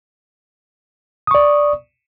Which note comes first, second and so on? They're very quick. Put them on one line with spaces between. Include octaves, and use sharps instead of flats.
D#6 C#6 D5